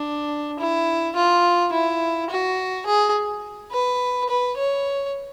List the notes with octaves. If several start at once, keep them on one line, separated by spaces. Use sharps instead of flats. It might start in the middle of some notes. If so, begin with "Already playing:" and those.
Already playing: D4
E4
F4
E4
F#4
G#4
B4
B4
C#5